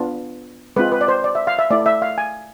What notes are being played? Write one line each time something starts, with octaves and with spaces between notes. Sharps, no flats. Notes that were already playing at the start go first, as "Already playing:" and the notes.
Already playing: B3 D4 F4
G#3 C4 F4 B4
B4
D5
C5
D5
E5
F5
E5
A3 E4 D5
E5
F5
G#5